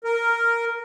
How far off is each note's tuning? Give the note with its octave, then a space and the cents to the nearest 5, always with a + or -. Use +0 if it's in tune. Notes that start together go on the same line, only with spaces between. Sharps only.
A#4 -5